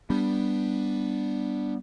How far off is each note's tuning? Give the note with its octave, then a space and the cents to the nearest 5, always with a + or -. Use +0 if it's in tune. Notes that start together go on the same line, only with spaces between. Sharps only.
G3 +0 B3 -5 D4 +0